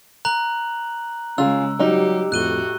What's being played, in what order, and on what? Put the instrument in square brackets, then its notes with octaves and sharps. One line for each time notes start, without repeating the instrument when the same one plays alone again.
[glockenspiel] A#5 F#6 F#7
[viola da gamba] C#3 G#3 [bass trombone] C#4 [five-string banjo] F4 G#4 [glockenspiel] E6
[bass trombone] F#3 [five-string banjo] G3 D#4 [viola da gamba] G4
[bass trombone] F2 [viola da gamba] A2 F#4 [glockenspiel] F#6 D#7 G7